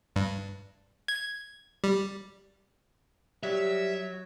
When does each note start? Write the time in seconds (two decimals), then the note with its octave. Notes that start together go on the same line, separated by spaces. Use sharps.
0.16 G2
1.08 G#6
1.84 G3
3.43 F#3 G3 E5